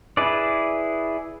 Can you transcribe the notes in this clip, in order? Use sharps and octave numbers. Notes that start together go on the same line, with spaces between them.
E4 G#4 B4 D5